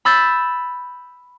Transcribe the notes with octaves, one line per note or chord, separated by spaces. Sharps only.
B5 E6 G6 A6